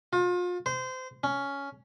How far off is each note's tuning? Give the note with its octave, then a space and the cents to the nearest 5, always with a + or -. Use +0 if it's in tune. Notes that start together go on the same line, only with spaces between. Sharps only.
F4 +35
C5 -25
C#4 +10